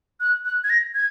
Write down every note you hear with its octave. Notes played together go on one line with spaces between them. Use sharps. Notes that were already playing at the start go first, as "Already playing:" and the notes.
F#6
F#6
G#6
A#6
G#6